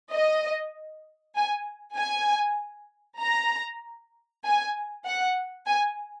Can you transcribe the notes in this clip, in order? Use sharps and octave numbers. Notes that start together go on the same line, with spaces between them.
D#5
G#5
G#5
A#5
G#5
F#5
G#5